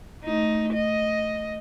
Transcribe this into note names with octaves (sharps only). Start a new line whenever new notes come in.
A3 D#4
D#5